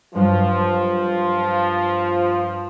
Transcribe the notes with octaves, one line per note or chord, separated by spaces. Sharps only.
G2 F3 F#3